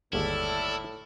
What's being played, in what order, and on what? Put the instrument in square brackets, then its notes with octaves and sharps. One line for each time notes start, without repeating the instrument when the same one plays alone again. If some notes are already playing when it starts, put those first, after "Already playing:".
[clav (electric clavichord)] G1 D#2 G#3 [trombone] A2 [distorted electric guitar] E4 [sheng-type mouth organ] A4 D5 F6